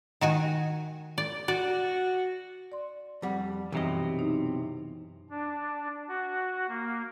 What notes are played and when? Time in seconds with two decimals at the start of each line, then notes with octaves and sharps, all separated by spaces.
0.21 D#3 F#4 G#5
1.18 D5
1.48 F#4 D5
2.72 D5 C6
3.22 F2 G3 F#5
3.72 B1 F#2 C3 E3 D#5
4.19 D#4
5.30 D4
6.08 F#4
6.69 A#3